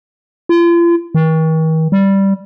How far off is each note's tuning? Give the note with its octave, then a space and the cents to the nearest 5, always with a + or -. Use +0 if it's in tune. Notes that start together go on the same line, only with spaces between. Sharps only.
F4 -40
D#3 +45
G3 -5